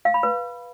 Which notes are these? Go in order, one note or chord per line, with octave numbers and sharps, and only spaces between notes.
F5
B5
B4